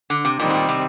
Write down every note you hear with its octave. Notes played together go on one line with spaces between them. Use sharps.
D3
C3
A#2 D#3 G3 C4
G#2
A#2
C3